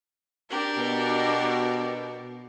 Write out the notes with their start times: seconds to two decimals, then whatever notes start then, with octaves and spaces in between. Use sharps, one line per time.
0.49 D4 G4 A#4
0.78 B2